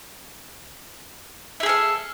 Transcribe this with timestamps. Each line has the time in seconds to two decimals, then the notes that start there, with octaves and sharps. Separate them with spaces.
1.60 E5
1.63 G#4
1.66 A4
1.69 F5